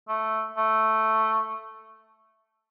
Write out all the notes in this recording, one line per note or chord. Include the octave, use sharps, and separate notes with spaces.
A3
A3